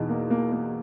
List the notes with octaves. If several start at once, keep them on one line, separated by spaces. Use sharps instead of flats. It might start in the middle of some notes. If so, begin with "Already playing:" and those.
Already playing: E2 B2 D#4
A#3
A#3
A#3